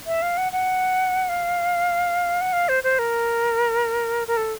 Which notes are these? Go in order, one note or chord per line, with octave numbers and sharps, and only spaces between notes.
E5
F5
F#5
F#5
F5
F#5
F5
C5
C5
A#4
A#4
A4